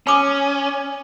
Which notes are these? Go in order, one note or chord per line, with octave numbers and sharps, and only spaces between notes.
C#4 G#5 D6 D#6